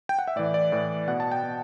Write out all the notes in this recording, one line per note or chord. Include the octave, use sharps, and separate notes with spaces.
G5
F#5
E5
A2 E3 D5
D5
A2 E3
B2 F#5
A5
G5
B2